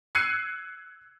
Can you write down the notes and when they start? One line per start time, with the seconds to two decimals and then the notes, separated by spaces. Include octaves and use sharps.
0.15 E6 F#6 G#6 C7 C#7 D#7